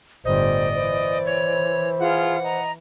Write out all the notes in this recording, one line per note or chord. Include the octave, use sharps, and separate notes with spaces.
G1 A2 C5 D5 D#5
E3 C5
C#5
F4 G#4 F#5 F6
D#5 A#5